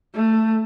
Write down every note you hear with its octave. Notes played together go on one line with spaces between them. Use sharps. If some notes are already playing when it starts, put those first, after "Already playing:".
A3